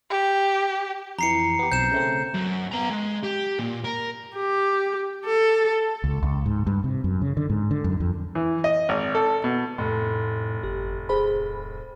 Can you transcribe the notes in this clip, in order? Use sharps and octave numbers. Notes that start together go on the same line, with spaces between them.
G4
F2 E3 A#5 C7 C#7
B3 G4
B1 C4 G6 C7 E7
C#3 A3 C4
F#2
B3 A#5
G#3
G4
A#2
A#4
G4
A4
C#2
C#2
G#2
G2
C3
F#2
C#3
D3
G#2
D3
F#2
F2
E3
D#5
G#1
A4
B2
F1 A2
G1 G4
D1 G#4 C5 B5